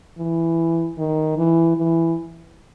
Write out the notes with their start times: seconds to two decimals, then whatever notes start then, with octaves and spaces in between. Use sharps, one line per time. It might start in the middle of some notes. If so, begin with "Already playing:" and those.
0.18 E3
0.98 D#3
1.37 E3
1.77 E3